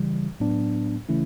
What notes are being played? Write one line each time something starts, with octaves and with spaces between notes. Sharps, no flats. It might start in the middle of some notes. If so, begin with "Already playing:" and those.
Already playing: C#3 E3 G3
A2 F#3 B3 D4
C#3 E3 A3 C#4 E4